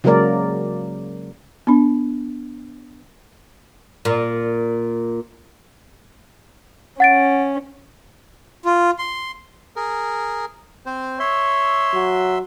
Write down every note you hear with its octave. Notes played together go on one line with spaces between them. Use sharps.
C#3 F#3 G#3 A#3 A#4 D5
B3 D4
A#2
C#4 F#5 A6 D7
F4
C6
G#4 A#4
C4 C5
C#5 E5 C6 E6
F#3